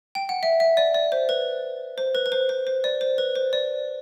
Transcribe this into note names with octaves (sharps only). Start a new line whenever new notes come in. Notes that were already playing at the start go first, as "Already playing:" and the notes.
G5
F#5
E5
E5
D5
D5
C5
B4
C5
B4
B4
C5
C5
C5
D5
C5
B4
C5
D5